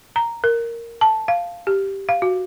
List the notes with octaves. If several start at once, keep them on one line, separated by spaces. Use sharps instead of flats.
A#5
A#4
A5
F5
G4
F5
F#4